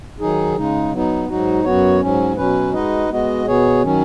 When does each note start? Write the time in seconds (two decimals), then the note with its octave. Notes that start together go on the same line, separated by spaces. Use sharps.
0.20 D#3 F#3 D#4 G#4
0.56 C#3 G#3 D#4
0.92 F#3 B3 D#4
1.28 G#2 F#3 D#4 F#4
1.64 F#2 F#3 B3 F#4 C#5
2.01 G#2 F#3 C#4
2.37 B2 F#3 C#4 B4
2.73 G#3 D#4 F#4 B4 D#5
3.09 G#3 B3 F#4 D#5
3.46 B2 B3 G#4 C#5
3.82 D#3 F#3 C#4